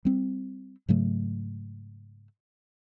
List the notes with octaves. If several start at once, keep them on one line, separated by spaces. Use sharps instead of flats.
G3 C4
G#2 C#3 F#3 A3